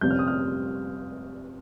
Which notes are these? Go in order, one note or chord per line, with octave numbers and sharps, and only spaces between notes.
G1 F2 C3 G3 C#4 G6
F6
D#6
F6